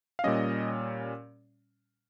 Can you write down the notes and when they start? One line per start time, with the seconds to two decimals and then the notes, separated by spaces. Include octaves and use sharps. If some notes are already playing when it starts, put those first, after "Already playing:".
0.19 F5
0.24 A#2 G3 C#4 D#5